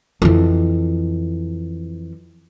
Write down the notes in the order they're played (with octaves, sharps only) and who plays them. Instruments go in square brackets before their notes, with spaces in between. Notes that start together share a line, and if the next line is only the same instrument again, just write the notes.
[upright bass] F2 E3